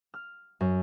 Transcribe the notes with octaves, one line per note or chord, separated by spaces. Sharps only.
F6
F#2